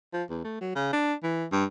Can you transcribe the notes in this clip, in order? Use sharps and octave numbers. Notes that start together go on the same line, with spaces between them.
F3
E2
A3
F#3
C#3
D4
E3
G2